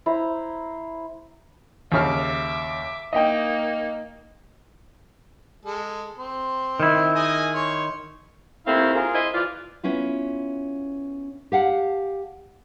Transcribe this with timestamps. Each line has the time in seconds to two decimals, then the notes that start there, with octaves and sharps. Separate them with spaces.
0.06 E4 C5 A#5
1.92 D#2 C#3 E5 D6 F6
3.13 A#3 D#4 D#5 G5
5.65 G#3 A4
6.18 C4 C6
6.80 D#3 E4
7.15 G#4 D#5 G#5
7.55 C#5 C6 C#6
8.66 D#2 A3 C4 E4 F5
8.95 F4 G#4 A#4
9.13 E4 C5 D#5
9.34 E3 F4 D5
9.83 B3 C#4 E4 F4
11.52 G4 F5 F#5 A5